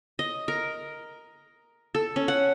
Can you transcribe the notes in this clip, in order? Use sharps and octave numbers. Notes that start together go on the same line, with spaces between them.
D#5
A#4
A4
C#4
F#5